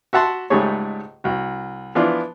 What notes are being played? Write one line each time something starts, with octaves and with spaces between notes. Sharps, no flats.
F#4 E5 F#5 A5 C6
C#2 G#2 G3 A3 G#4 C#5
C2 F#4
E3 F3 B3 D4 E4 F4